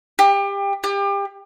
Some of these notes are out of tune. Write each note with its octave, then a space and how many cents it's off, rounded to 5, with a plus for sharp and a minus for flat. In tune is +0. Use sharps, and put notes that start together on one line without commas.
G4 +25
G4 +30